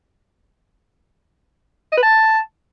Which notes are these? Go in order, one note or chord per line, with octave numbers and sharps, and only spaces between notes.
D#5
B4
A5